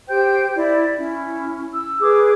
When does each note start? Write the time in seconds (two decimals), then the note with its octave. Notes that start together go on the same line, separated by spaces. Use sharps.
0.09 G4 C5 G5 G6
0.55 E4 D5
0.97 C#4 E4
1.73 E6
2.01 G#4 B4 D6